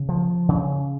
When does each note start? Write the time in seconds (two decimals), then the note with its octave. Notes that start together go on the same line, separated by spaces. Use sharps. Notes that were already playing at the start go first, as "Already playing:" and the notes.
Already playing: C#3
0.09 F3
0.49 C#3